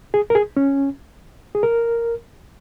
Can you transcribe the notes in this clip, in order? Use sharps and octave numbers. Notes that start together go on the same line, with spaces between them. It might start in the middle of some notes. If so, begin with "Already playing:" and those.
G#4
A#4
G#4
C#4
G#4
A#4